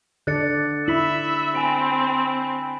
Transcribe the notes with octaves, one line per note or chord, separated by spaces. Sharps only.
D3 A4 D5 F#6 A6 C#7
E4 E5 B5 B6 F#7
C4 G#5 B5 D7